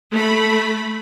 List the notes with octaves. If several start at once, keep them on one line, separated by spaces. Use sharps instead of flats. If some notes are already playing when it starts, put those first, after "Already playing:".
A3 B5